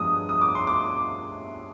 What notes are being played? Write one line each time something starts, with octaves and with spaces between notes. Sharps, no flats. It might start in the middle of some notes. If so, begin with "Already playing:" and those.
Already playing: G2 F3 G#3 B3 D#6
D#6
D6
C6
D6